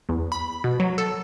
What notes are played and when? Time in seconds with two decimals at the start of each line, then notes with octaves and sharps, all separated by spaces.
0.09 E2
0.32 B5
0.64 B2
0.80 F#3
0.98 A4